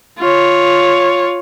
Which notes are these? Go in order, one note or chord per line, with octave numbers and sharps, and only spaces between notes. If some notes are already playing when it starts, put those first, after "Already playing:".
F4 C#5